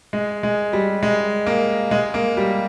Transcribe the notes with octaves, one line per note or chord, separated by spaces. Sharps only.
G#3
G#3
G3
G#3
A#3
G#3
A#3
G3